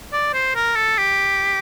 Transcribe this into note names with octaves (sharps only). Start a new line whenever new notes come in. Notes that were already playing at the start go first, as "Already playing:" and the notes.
D5
C5
A#4
A4
G4